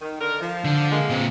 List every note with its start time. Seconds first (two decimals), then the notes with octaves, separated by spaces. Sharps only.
0.01 D#3
0.20 D3 A#4
0.41 F3
0.64 D3
0.92 G#3 A#3
1.10 A#2 C4